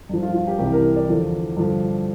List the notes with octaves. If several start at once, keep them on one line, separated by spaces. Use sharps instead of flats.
G2 F3
F4
F4
G4
C2 C3 E3 G4
A#4
D5
E2 D3 F3
G2 D3 F3